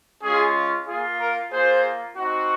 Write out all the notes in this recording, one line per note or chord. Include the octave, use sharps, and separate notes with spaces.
G#3 C#4 F4 G#4
A#3 F4 G#4
A#4
A#3 F4 G#4 C5
C4 D#4 F#4